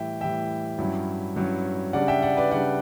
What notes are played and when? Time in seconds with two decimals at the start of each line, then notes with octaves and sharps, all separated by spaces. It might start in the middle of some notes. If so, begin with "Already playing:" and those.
Already playing: A2 E3 G3 E5 G5
0.21 A2 E3 G3 E5 G5
0.78 G2 F#3 C#4 E4
1.36 G2 F#3 C#4 E4
1.93 C#3 G3 D4 D5 F#5
2.08 E5 G5
2.22 D5 F#5
2.37 B4 D5
2.51 C#3 G3 D4 D5 F#5